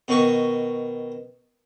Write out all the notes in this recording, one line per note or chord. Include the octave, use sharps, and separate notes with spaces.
B2 D#3 C#6